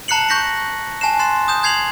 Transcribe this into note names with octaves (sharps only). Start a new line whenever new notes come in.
A5 A#5 F#6 C7 C#7 F#7
C#6 G6 A#6 B6 C#7
G#5 A5 F#6 C7 E7
C6 F#6 A6 C7 E7
D#6 G6 E7
G6 G#6 C7 F7 F#7